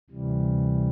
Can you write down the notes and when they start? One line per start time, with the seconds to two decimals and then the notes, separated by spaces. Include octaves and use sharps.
0.10 D2 C3 E3 G3